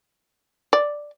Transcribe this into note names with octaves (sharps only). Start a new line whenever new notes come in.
D5